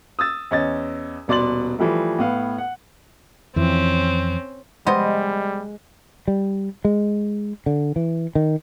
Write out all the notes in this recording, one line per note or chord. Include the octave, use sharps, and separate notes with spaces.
D#6 E6 A6
E2 C#4 D#5 A6
D#1 B2 D5 C6 A6 F#7
E3 F3 G3 A3
A2 B3 F5
F#5
F2 E3 C4 C#4
G3 G#3 B3 C5 D#5
G3
G#3
D3
E3
D#3